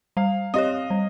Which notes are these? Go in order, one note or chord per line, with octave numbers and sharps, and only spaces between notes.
G3 F5
C4 G4 C#5 D#5
G3